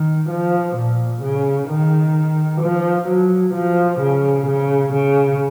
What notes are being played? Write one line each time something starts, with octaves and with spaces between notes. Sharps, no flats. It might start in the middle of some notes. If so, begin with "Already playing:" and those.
Already playing: D#3
F3
A#2
C#3
D#3
F3
F#3
F3
C#3
C#3
C#3